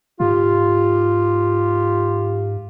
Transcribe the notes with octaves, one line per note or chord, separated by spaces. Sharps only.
G#2 F4 G4